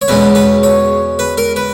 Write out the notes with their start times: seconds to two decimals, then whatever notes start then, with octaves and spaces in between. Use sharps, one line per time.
0.02 C#5
0.08 E2 B2 G#3 C#4 B4
0.35 B4
0.63 C#5
1.19 B4
1.38 A#4
1.56 B4